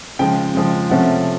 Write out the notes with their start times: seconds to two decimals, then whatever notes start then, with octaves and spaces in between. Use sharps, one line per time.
0.19 C#3 F3 G#3 G5
0.55 C#3 F3 G#3
0.90 C3 F3 A3 C#4 F#5